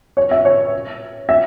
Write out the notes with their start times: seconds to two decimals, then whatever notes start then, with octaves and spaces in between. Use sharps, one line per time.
0.17 C#5
0.31 E5
0.45 C#5
1.29 E5